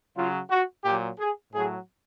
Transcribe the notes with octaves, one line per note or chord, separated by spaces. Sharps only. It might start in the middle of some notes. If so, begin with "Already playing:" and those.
C#3 F#3 F4
F#4
A#2 F#3 G4
G#4
A2 F#3 G#4